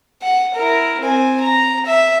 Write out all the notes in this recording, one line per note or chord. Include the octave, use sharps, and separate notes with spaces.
F#5
E4 A#4
C4 G#5
A#5
E5